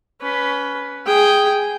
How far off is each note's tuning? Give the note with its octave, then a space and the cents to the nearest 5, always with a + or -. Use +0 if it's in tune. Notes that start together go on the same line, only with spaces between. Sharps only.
C#4 +25 B4 +0
G#4 +0 G5 +0